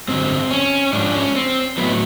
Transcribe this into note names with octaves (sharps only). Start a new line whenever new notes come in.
G2 D3 F#3 C4
C#4
G#2 F3 D4
C#4
C4
A2 F#3 B3